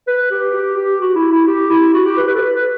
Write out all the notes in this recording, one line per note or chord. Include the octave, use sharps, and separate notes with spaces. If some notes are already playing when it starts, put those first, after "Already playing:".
B4
G4
G4
G4
F#4
E4
E4
G4
E4
F#4
G4
B4
B4
A4
B4
B4